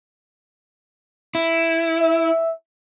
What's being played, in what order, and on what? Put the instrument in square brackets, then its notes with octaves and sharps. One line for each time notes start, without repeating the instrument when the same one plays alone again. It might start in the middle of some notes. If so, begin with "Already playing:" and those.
[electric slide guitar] E4
[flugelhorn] E5